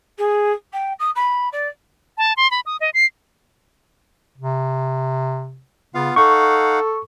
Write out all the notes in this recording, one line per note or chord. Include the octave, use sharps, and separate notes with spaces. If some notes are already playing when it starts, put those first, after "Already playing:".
G#4
G5
D#6
B5
D5
A5
C6
B5
D#6
D#5
C7
C3
C#3 B3 F4 F5
D#4 A4 F5 F#5 C#6